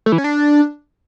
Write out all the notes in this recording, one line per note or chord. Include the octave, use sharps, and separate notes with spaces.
A3
E3
C#4
D4